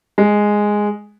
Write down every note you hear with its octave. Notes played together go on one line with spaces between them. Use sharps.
G#3